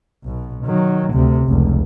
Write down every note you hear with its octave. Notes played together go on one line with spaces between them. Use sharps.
B1 B2
D#3 F#3
D2 C3
F1 C#2